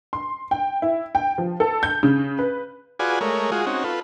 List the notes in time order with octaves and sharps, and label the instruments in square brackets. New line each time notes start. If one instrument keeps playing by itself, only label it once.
[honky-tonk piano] C6
G5
E4
G5
F3
A4
G6
C#3
B4
[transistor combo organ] F4 F#4 G#4 B4 D5 G#5
G#3 A3 A#4 C#5
G#3 F4 F#4 G#4
C4 C#4 D#4 F#4
F4 A4 B4